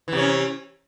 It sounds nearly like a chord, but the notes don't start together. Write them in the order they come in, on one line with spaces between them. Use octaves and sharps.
E3 C3 C#4